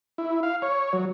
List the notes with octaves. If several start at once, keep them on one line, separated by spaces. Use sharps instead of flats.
E4
F5
C#5
F#3